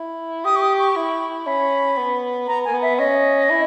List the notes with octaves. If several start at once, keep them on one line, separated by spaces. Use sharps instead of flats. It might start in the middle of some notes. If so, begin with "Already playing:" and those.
Already playing: E4
G4 D#6
C#6
D#6
C#6
E4
C#4 B5
B3
B3 A#5
A#3 G#5
B3
E5
C#4 D#5
E4